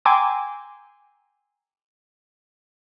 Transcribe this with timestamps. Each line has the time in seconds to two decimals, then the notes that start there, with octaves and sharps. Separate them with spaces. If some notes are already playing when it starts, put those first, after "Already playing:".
0.05 G5 G#5 A#5 C6 D6 E6